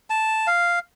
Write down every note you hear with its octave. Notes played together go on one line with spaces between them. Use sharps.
A5
F5